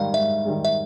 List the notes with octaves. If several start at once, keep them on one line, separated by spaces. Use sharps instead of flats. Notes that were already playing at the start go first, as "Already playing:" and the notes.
Already playing: G#2 D#3 G3 F5
G#2 E5
D#3 G3
E5